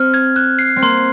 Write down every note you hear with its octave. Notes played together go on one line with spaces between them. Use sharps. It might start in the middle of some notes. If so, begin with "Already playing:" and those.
Already playing: C4 F6
G#6
F#6
C7
C4
A#3 C6